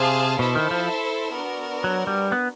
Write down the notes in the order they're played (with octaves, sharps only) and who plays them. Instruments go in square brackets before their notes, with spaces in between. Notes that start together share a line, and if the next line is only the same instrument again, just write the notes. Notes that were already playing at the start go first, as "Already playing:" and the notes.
Already playing: [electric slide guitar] C3 [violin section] G#4 C5 F5 A5
[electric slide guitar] B2 [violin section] E4 A4 C5 E5
[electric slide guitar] D#3
F3
[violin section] B3 D4 F#4 A#4
[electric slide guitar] F#3
G3
B3